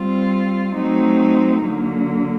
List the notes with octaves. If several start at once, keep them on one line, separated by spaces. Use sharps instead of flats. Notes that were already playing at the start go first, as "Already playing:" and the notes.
Already playing: G3 C4 F4
F#3 A3 C4 D#4
D3 F#3 A#3